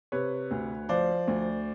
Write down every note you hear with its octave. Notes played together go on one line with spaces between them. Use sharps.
C3 B4 C#5
D2
F3 C5 D5
D2